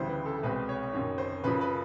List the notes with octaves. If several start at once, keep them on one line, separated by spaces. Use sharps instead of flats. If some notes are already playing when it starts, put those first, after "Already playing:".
Already playing: D2 C#3 E3 G3 B3 C5
B4
A4
C2 B2 G#3 C4 B4
C#5
F#1 F#2 D#3 C#5
C5
F#1 F#2 C#3 F3 B4
B4